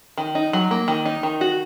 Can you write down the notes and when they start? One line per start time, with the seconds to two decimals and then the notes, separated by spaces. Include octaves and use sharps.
0.18 D#3
0.35 D#4
0.53 F#3
0.71 A#3
0.88 D#3
1.06 D#4
1.23 D#3
1.41 F#4